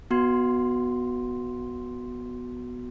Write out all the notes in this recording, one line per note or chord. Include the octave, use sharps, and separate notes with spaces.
B3 F#4 C6